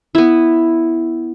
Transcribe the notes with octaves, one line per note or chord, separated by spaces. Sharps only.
B3 E4